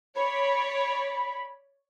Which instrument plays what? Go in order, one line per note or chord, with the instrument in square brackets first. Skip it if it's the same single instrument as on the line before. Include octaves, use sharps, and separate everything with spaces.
[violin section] C#5 D5 [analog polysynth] B5